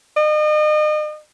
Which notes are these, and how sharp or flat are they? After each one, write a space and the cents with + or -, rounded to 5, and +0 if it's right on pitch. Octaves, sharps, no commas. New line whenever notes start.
D#5 -40